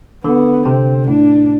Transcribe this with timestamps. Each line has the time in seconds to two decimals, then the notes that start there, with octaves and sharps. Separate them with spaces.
0.24 D3 B3
0.65 C3 C4
1.07 A2 D4